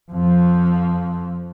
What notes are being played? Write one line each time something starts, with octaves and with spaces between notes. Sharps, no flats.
F2 F3